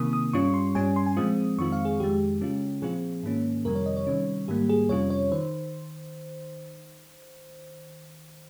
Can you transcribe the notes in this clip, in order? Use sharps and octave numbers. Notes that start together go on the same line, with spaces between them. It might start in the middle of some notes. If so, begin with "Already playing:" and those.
Already playing: C3 D#3 A#3 D#6
D#6
G2 G3 C#4 F4 C#6
C6
G2 G3 C#4 G#5
C6
G#5
A#2 F3 G#3 C4 F4 D#6
F2 D#3 G#3 C4 F4 C#6
F5
G#4
F2 D#3 G#3 G4
C#3 G#3 C#4 F4
A#2 F3 C4 F4 G#4
G#2 D#3 A#3 C#4
F2 C3 D#3 G3 A#4
C#5
D#5
C#5
C3 D#3 G3 C#4
G#2 D#3 G3 A#3 G4
G#4
F2 C3 G3 C#4 F4 C#5
C#5
D#3 C5